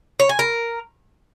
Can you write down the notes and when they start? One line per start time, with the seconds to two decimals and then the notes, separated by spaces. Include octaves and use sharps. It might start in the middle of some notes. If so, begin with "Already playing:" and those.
0.20 C#5
0.29 G#5
0.39 A#4